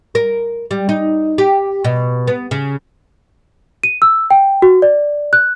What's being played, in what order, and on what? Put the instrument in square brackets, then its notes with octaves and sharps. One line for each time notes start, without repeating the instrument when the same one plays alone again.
[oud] A#4
G3
D#4
G4
B2
B3
C#3
[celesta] D#7
E6
G5
F#4
D5
F#6